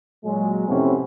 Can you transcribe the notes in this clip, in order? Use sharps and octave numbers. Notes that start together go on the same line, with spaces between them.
A#2 F#3 G#3
F2 A2 C3 E3 B3 C#4